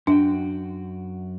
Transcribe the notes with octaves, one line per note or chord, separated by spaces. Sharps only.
F#2 D4 F#4 G5